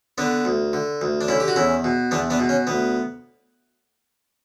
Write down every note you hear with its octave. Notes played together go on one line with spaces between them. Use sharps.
D3 B3 D4
D2
D3
D2
D4
D3 C#4 E4
G4
F#4
E2 C#4 E4
B2
E2 B3 D4
B3 D4
B2
C#4
D2 B3